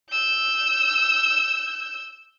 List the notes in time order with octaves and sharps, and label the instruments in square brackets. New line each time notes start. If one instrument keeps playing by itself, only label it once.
[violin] E6 G6